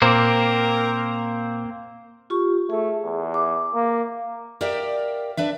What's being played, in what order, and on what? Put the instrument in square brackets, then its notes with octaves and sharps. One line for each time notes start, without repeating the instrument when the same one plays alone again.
[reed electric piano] A#2 C5 D6 [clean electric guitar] A#3 C4 [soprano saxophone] A#4
[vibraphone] F4 G4 C#6
[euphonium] A3 [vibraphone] G#4
[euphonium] E2
[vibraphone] D6
[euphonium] A#3
[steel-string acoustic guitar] G4 A#4 D5 E5 F5 G5
D4 B4 E5